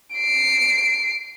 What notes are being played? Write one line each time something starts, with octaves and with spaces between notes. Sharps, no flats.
C7 D7